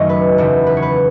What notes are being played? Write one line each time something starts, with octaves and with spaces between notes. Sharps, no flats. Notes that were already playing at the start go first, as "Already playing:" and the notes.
Already playing: F#1 F#2 D#3 A3 C#4 D#5
B4
F#1 E2 C#3 E3 A3
B4
C#5
B4